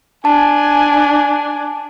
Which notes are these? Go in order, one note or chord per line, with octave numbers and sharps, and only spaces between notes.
D4 G#5 A5